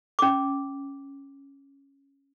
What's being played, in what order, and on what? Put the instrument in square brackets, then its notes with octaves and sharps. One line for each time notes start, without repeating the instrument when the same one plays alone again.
[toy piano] C#4 D6